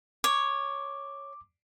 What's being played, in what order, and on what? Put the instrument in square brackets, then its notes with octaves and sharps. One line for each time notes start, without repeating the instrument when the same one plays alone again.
[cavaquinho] C#5 [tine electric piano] D6